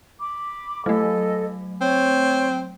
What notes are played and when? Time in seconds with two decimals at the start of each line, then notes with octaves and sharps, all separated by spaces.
0.20 B5 D6
0.86 F#3 A3 A4 D#5
1.81 C4 C#5